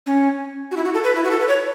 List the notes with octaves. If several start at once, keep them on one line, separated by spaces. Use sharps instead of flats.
C#4
F#4
E4
F#4
A4
B4
E4
F#4
A4
B4
C#5